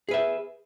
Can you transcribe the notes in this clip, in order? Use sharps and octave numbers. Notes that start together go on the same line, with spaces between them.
G#4 B4 E5